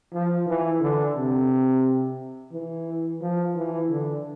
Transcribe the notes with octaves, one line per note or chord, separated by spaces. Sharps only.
F3
E3
D3
C3
E3
F3
E3
D3